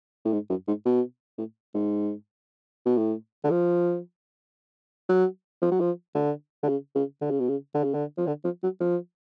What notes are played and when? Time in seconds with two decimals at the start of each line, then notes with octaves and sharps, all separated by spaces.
0.25 A2
0.33 G#2
0.50 F#2
0.67 G#2
0.85 B2
1.38 A2
1.74 G#2
2.86 B2
2.97 A2
3.44 D3
3.50 F3
5.09 F#3
5.62 F3
5.71 F#3
5.80 F3
6.15 D3
6.63 D3
6.68 C#3
6.95 C#3
7.21 D3
7.30 C#3
7.40 B2
7.49 C#3
7.74 D3
7.84 C#3
7.94 D3
8.18 F3
8.27 D3
8.44 F3
8.63 F#3
8.80 F3